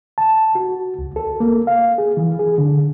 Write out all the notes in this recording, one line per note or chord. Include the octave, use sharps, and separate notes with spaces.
A5
F#4
C#2
A4
A#3
F5
G#4
E3
G#4
D3